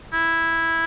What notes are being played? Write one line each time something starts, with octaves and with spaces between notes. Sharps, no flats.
E4